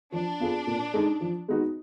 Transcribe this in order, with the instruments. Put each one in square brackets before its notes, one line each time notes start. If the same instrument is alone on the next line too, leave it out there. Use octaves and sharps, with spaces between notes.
[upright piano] F3 [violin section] D4
[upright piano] B3 F4 G#4
A#2
G#3 D#4
F3
G#3 B3 D#4 F#4